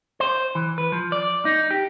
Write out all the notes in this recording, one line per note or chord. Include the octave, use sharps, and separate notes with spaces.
C5
E3
B4
F3
D5
D#4
G4